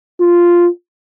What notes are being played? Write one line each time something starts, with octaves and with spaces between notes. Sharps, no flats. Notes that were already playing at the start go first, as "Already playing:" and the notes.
F4